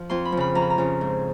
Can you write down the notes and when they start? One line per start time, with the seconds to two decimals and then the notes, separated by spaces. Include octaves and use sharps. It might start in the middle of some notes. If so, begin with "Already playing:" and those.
Already playing: F3
0.10 F2 C6
0.25 B5
0.32 F3
0.37 C#3 B5
0.55 F2 A#5
0.62 B5
0.70 A#5
0.78 C#3 F3
1.01 G#2